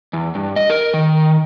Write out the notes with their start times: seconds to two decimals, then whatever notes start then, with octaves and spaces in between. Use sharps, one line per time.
0.13 E2
0.35 G2
0.56 D#5
0.70 A#4
0.94 D#3